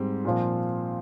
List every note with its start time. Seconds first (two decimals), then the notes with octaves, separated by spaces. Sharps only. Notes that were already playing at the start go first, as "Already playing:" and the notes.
Already playing: G#2 G3 C4
0.25 A#2 F3